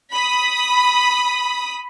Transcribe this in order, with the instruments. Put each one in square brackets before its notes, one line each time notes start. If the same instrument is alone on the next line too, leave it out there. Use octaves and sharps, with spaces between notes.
[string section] B5 D#6